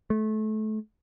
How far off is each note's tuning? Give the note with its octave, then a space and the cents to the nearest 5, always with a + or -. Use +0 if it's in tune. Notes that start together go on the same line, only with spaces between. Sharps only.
A3 -25